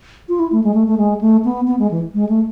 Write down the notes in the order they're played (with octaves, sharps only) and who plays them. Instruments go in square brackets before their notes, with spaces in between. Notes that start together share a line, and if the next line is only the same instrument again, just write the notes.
[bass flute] F4
E4
A3
G#3
A3
A3
G#3
A3
B3
B3
G#3
E3
G#3
A3